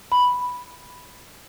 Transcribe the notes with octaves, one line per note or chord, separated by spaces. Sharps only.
B5